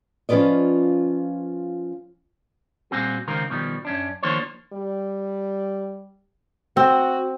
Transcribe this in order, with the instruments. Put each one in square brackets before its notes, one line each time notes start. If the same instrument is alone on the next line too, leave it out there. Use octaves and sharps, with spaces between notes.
[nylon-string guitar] F3 C#4 F4 B4 D5 D#5
[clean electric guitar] A#2 G3 C4 F#4 G#4
C#2 C3 D#3 C4 A#4
B2 D#3 F3 G3
F#2 C#4 D4
D#3 F3 A#3 D4 C5 C#5
[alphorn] G3
[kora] C4 [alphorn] F#4